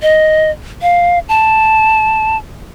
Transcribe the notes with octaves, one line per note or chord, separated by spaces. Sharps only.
D#5
F5
A5